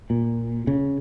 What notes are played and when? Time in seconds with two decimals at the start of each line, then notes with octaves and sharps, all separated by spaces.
0.10 A#2
0.67 C#3